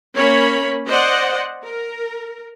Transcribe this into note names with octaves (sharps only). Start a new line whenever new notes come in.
A#3 C#4 C#5 B5
C5 D5 D#5 F#5
A#4